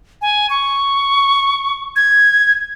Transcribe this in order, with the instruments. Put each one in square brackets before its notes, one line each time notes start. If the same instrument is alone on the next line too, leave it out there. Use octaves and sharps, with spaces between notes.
[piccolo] G#5
C#6
G#6